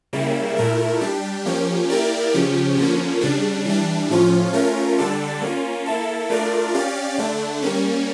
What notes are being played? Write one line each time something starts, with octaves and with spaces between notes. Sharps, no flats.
C#3 G3 A#3 E4
A#2 A3 E4 A#4
G3 D4 G4
F3 A#3 C#4 G4
A#3 E4 G4 A#4 D5
C#3 F3 C#4 G4
D3 F3 A#3 C#4
C#3 G3 D4
E3 G3 D4
A2 F3 C#4 F4
A3 C#4 F4 A#4
D3 G3 D4 A4 D5
A#3 C#4 F4
A#3 E4 A4
A3 D4 F4 A#4 D5
C#4 G4 D5 F5
D3 A3 D4
G3 A#3 C#4